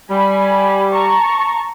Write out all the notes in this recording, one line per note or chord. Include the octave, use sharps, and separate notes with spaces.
G3 G#5 B5
A5 A#5 C#6